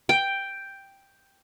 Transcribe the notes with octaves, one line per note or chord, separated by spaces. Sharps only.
G5